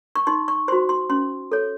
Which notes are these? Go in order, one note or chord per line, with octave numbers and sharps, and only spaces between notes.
C#6
D#4 C6
C#6
F#4 C5 C6
C6
C#4 C6
A4 C#5